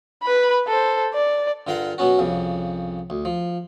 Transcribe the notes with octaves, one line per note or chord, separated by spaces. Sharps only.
B4 B5
A4 C5
D5
G2 D3 F4 A#4 F5 F#5
B2 F#3 B3 C#4 F#4
C2 F2 C#3
D2
F3